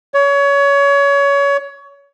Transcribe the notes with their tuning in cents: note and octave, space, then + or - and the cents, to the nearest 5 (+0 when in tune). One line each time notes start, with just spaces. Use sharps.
C#5 +25